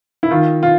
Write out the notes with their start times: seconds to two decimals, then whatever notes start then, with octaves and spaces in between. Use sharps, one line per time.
0.23 E4
0.31 D#3 F4
0.63 F4